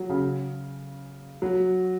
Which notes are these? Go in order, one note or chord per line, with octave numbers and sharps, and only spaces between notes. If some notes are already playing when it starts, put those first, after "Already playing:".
Already playing: F#3
C#3
F#3